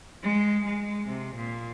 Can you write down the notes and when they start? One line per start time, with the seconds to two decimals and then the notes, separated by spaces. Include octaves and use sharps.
0.23 G#3
0.65 G#3
1.08 C3
1.35 A#2